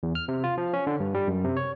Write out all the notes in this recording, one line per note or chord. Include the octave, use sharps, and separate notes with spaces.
E2
F6
C3
F4
F3
C#4
D3
G2
G3
F#2
C3
C#5